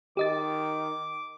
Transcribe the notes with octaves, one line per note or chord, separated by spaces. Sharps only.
D#3 G4 D#5 D6 A6